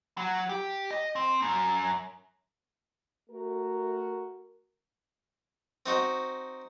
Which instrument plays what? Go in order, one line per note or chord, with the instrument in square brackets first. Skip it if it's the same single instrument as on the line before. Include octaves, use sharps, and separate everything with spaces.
[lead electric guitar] F#3
G4
D#5
C4
F#2
[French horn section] A3 F#4 A#4
[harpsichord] C4 D#4 F#4